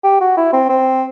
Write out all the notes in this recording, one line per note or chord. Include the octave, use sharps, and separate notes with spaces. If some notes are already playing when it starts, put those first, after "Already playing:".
G4
F#4
E4
C4
C4